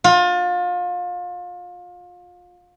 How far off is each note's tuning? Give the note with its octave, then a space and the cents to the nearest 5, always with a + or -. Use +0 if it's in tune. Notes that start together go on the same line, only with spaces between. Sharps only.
F4 +30